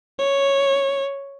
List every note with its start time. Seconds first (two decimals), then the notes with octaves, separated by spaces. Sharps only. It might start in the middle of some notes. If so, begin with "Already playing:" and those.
0.19 C#5